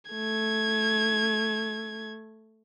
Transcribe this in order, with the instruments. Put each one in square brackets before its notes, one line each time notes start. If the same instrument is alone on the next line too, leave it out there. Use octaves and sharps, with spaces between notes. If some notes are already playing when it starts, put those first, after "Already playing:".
[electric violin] A3 G#6